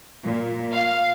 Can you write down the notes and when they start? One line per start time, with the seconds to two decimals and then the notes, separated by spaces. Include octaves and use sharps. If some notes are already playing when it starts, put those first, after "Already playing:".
0.25 A#2
0.73 F5